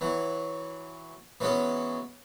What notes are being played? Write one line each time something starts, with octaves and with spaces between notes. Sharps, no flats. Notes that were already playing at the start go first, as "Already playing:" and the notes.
E3 F#3
E3 F#3 G#3 B3 C#4